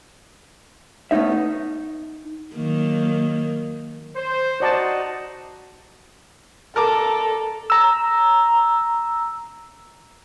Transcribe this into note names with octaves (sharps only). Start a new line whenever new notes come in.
A3 B3 C#4 D#4 E5
D#4
D#3 F#3 A#3
C5
D#4 F#4 C5 D5 A5
A4 A#4 A5 D6
A#5 E6